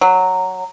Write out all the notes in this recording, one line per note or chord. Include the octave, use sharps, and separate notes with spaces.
F#3